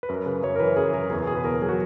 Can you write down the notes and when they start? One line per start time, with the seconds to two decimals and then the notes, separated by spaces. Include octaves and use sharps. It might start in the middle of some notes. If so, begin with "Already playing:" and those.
0.03 B4
0.09 F#2 A#4
0.26 C#3 B4
0.43 F#2 C#5
0.56 A#4
0.60 E3 B4
0.76 F#2 G#4
0.94 C#3 A#4
1.10 E2 G#4
1.27 B2 G#4
1.37 B4
1.44 E2 A#4
1.62 F#3 G#4
1.69 F#4